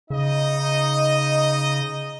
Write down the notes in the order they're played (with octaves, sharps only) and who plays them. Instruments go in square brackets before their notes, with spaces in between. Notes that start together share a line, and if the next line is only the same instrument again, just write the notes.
[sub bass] C#3 [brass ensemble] D#4 D#5